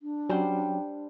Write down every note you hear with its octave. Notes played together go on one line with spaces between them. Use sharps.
D4
F#3 G3 C#4 C5 G5